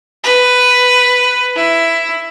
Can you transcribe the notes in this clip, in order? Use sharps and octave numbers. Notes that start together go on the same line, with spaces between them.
B4
E4